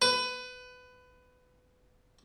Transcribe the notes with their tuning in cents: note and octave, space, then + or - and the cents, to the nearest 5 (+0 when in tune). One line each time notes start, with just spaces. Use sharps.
B4 +20